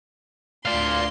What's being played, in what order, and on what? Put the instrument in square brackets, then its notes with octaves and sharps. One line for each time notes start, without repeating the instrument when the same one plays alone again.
[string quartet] D2 F4 C6 [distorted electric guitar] D5 F5